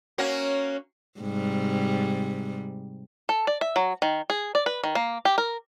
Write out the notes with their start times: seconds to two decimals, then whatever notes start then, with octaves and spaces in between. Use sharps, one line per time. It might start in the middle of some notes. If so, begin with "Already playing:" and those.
0.18 A#3 C#4 F#4
1.20 G#2 C3 G3
3.29 A4
3.47 D5
3.61 E5
3.76 F#3
4.02 D#3
4.30 G#4
4.55 D5
4.66 B4
4.84 D#3
4.95 A#3
5.25 G4
5.38 A#4